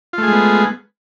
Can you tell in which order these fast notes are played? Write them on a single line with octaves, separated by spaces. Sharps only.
F4 A3 G#4 G#3 B3